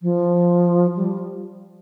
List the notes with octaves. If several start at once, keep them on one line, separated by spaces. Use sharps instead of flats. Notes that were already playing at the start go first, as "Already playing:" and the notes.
F3
G3